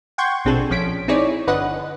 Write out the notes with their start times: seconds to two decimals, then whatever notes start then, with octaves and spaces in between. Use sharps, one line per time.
0.18 F#5 G5 C6 C#6 G6 G#6
0.45 A#1 B2 C4 D4 G#4 A4
0.70 A#1 F3 C#4 B6 D7
1.08 C4 D#4 E4 G#4 C#5 D5
1.47 G1 D3 B4 D#5 F#5